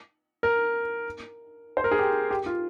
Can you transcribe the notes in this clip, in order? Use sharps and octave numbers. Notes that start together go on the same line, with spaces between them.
A#4
C5
A#4
G#4
G4
G4
F4